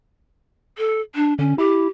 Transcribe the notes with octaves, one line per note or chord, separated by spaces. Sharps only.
A4
D4
D3 C#4
E4 G4